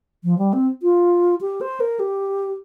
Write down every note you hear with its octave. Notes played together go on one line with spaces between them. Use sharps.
F3
G3
C4
F4
G4
C5
A#4
G4